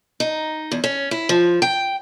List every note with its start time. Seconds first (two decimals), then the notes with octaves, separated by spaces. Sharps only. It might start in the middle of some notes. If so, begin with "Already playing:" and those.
0.20 D#4
0.71 E2
0.84 C#4
1.11 E4
1.29 F3
1.62 G5